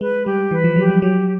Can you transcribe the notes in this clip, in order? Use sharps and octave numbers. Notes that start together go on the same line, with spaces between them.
G#3 B4
G3 G4
E3 B4
F3
F#3 G4
G3
F#3 G4